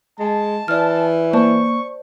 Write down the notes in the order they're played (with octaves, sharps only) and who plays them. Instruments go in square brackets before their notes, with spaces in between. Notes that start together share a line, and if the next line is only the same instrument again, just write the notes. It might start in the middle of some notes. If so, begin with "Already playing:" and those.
[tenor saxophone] G#3 [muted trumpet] A5
[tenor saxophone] E3 [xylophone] D5 F6
[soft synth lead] A#3 [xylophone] C5 D5 A5 [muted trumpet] C#6